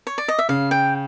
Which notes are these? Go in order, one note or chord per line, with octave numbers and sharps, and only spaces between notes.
C#5
D5
D#5
E5
C#3 F5
G5